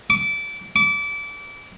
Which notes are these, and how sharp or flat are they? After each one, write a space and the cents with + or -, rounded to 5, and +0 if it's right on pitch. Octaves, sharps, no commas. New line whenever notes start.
D6 -25
D6 -30